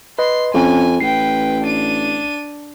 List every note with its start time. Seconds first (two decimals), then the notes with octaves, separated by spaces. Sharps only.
0.19 B4 D#5 C6
0.54 F2 C#4 G#5
1.00 A1 B4 G5 C7
1.63 D4 D#7